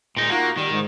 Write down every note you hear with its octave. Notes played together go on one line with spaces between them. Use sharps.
A#2 G#3 D#4
A#3 D#4 F4 F#4
D#3 G3
G#2